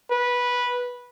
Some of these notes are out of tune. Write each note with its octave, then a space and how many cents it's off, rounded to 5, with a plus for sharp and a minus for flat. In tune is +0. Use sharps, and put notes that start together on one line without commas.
B4 -10